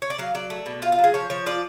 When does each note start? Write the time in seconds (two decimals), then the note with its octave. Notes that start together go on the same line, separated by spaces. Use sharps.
0.02 C#5
0.10 D5
0.18 F#3 F5
0.35 F#3 D5
0.50 A3
0.66 B2
0.82 F4 F5
0.92 F5
0.98 F#3
1.04 G#4
1.14 F3 C#5
1.30 F3 C#5
1.46 F4 D5